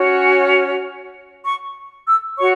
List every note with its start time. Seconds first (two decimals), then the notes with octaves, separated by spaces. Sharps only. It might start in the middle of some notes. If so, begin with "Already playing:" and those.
Already playing: C#4 F#4 C#5
0.18 G#5
1.45 C#6
2.07 E6
2.38 F#4 C#5 C#6